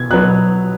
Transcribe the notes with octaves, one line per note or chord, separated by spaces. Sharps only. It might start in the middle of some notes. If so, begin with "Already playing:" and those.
Already playing: B2 B3 G#6
B2 F#3 B3 F#6